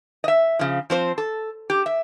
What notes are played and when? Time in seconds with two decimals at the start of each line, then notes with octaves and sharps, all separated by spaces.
0.24 D#5 E5
0.59 C#3 F3
0.90 F3 C4 C5
1.18 A4
1.70 G4
1.86 E5